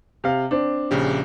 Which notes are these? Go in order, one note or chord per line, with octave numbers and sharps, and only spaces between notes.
C3 F5
C4 D4
A#1 C#3 G4